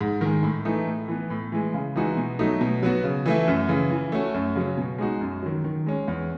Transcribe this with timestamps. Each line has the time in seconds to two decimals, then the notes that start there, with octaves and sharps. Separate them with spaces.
0.01 G#2
0.21 D#3 G#3
0.43 A2
0.65 E3 A3 D#4
0.87 A2
1.08 E3 B3
1.30 A2
1.52 E3 G#3
1.74 C#3
1.96 E3 G#3 D#4 F#4
2.17 B2
2.39 F#3 A3 D#4
2.61 B2
2.83 F#3 B3 F#4
3.04 C#3
3.26 E3 A3 E4
3.48 F#2
3.69 C#3 E3
3.91 E3
4.12 A3 C#4 F#4
4.34 F#2
4.55 C#3 F#3 C#4
4.77 B2
4.98 G#3 D#4 F#4
5.21 F#2
5.43 D#3 F#3
5.64 D#3
5.86 G#3 C#4
6.08 E2